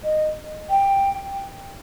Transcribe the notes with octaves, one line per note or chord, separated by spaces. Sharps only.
D#5
G5